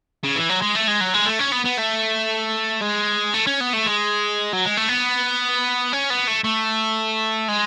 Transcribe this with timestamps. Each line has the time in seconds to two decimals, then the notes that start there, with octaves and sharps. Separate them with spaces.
0.24 C#3
0.36 E3
0.49 F#3
0.61 G#3
0.75 A3
0.87 G#3
1.01 F#3
1.14 G#3
1.26 A3
1.40 C#4
1.53 B3
1.66 B3
1.79 A3
2.82 G#3
3.34 A3
3.47 C#4
3.61 B3
3.73 A3
3.86 G#3
4.53 F#3
4.65 G#3
4.77 A3
4.89 B3
5.93 C#4
6.10 B3
6.27 A3
6.44 A3
7.48 G#3